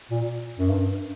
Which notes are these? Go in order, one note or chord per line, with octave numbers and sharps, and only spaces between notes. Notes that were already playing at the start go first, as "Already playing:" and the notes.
A#2
F#2
G2